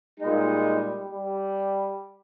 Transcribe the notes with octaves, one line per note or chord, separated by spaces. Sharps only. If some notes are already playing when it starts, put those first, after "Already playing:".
A#2 G3 G#3 D#4
G3